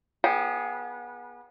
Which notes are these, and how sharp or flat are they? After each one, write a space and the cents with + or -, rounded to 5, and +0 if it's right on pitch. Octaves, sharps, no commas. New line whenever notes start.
B3 -30 G#4 +0 G5 +0